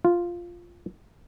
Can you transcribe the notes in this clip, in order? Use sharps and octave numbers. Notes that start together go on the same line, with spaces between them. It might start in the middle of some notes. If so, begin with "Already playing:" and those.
F4